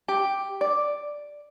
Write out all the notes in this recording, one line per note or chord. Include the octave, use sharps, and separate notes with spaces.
G4
D5